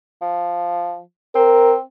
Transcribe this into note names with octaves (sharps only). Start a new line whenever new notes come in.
F3
C4 A#4